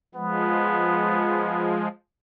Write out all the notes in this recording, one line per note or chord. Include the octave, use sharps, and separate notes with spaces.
F3 G#3 B3